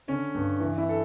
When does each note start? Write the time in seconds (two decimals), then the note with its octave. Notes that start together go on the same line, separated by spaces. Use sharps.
0.08 D3 C#4
0.35 G2
0.60 E3
0.78 E4
0.89 A4